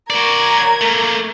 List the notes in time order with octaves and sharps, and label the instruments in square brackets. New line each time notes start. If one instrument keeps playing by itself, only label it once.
[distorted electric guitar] F#4 D5 [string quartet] A#4 G#6
[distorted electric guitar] A3 A#3